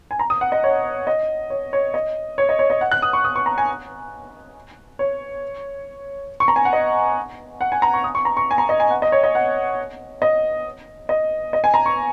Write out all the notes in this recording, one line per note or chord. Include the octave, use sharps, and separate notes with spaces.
G#5
A#5
D#6
F#5
D#5
C#5
D#5
C#5
C#5
D#5
C#5
D#5
C#5
D#5
F#5
F#6
D#6
C#6
D#6
C#6
A#5
G#5
C#5
C#6
A#5
G#5
F#5
D#5
F#5
G#5
A#5
C#6
D#6
C#6
A#5
C#6
G#5
A#5
D#5
G#5
F#5
D#5
C#5
D#5
F#5
D#5
D#5
D#5
G#5
A#5
C#6